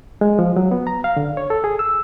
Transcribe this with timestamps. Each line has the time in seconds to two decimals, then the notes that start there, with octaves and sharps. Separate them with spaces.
0.21 G#3
0.39 F3
0.56 F#3
0.71 B3
0.87 A#5
1.04 F5
1.17 D3
1.37 C#5
1.50 A4
1.64 G#4
1.79 E6